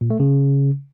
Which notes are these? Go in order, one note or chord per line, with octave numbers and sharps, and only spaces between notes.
A#2
A3
C#3